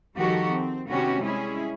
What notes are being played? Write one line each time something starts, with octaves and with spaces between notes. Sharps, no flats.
D#3 F3 G3 F#4 G4 A4
C4
C3 D#3 B3 C#4 F#4 G4
G3 G#3 C#4 E4 G#4